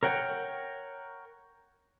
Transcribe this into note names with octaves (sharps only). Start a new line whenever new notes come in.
A#4 C#5 F#5 G5